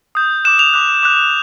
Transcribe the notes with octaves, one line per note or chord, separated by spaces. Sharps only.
D#6 G6
D6 F#6 E7
F7
D6 F#6
D6 F#6